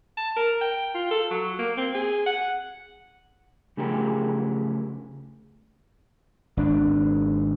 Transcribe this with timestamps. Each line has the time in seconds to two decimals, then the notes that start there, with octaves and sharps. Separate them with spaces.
0.17 A5
0.36 A#4
0.61 G5
0.94 F4
1.11 A4
1.31 F#3
1.59 A#3
1.77 C4
1.95 G#4
2.26 F#5
3.77 C#3 F3 A3 G4 G#4 A#4
6.57 G#1 D4